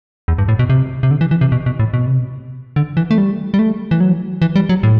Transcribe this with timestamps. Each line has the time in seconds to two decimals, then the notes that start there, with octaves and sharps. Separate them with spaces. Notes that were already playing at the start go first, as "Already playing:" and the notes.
0.28 E2
0.38 G2
0.49 A2
0.59 B2
0.70 C3
1.03 C3
1.11 D3
1.21 E3
1.31 E3
1.41 C3
1.52 B2
1.66 B2
1.80 A2
1.94 B2
2.07 C3
2.19 B2
2.76 D3
2.97 E3
3.11 A3
3.18 G3
3.54 G3
3.59 A3
3.91 E3
4.00 F#3
4.42 E3
4.56 G3
4.69 F#3
4.83 A2